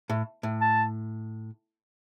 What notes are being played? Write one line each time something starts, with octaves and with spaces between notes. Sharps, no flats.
A2
A2
A5